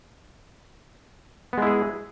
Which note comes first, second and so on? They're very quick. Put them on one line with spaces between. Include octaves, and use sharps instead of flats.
B3 G#3 E4 G#4